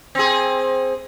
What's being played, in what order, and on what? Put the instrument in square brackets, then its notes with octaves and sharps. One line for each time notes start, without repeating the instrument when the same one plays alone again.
[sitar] C4 G#4